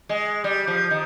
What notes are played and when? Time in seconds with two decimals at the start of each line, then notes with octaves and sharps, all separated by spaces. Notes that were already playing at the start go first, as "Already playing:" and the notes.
0.09 G#3
0.44 G3
0.67 F3
0.90 D#3